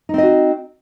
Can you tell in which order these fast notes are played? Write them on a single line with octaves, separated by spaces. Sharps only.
D#4 C4 D#5 F#4